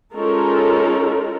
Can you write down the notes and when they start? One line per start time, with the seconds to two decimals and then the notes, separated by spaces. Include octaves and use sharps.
0.14 G#3 C#4 D#4 F4 A4 A#4